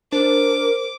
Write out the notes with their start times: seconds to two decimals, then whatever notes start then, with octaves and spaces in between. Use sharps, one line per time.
0.12 D4 A#4 C5 D6